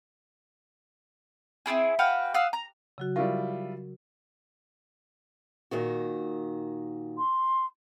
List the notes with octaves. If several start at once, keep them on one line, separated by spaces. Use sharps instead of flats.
C4 C#4 E4 G#4
F#4 B4 F5 G5
F5 F#5 D#6 E6
A#5
C#3 F#3 F#4
G3 E4 F4 A#4 C#6
A#2 D#3 F#4
C6